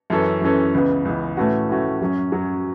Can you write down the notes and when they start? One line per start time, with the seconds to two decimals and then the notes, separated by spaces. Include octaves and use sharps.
0.10 F#2 E3 C#4 A4
0.41 F#2 E3 C#4 A4
0.74 C#2 C#3 E3 B3
1.05 C#2 C#3 E3 B3
1.37 A2 E3 A3 C#4 F#4
1.69 A2 E3 A3 C#4 F#4
2.01 F#2 F#3 C#4
2.32 F#2 F#3 C#4